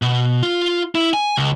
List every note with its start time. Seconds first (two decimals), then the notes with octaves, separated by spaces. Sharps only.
0.02 B2
0.43 F4
0.95 E4
1.14 G#5
1.37 C#2